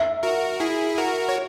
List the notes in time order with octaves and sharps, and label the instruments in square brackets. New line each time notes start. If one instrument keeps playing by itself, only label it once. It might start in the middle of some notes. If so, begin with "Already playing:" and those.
Already playing: [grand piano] E5
[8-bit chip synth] F#4 A#4
E4 G#4
F#4 A#4
C#5